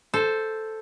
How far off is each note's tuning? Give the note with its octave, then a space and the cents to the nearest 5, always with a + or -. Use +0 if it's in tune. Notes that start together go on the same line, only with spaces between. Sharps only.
A4 +0 C5 +0